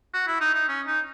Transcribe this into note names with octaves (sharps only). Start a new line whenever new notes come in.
F#4
E4
D#4
D#4
C#4
D#4